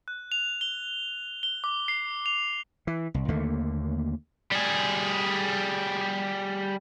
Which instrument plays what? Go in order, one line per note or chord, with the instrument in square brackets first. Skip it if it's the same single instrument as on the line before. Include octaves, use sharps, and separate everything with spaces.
[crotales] F#6
F7
G7
G7
D6
C7
F7
[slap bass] E3
C2
D#2 D3 A3 A#3
[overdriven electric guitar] G3 G#4